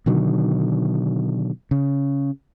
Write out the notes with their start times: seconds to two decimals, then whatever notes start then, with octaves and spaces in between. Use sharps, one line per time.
0.06 B2 D3 D#3 F#3
1.71 C#3